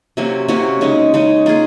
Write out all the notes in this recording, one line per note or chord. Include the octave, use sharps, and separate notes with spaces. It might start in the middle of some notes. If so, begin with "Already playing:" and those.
C3 F#3 A#3 C#4
C3 F#3 A#3 C#4
C#3 G#3 D#4
C#3 G#3 D#4
A#3 F4 G#4